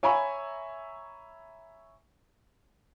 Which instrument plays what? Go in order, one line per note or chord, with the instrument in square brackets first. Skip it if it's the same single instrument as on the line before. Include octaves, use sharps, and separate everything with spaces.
[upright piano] C#5 E5 G#5 A#5 B5 C#6